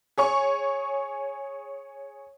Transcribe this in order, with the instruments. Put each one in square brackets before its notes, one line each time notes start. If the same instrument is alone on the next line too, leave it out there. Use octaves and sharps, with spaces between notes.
[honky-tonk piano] G#4 C#5 C#6